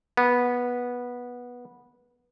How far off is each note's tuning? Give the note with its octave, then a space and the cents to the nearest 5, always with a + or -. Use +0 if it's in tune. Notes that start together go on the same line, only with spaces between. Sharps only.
B3 -10